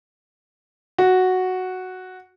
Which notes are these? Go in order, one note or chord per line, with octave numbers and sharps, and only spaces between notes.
F#4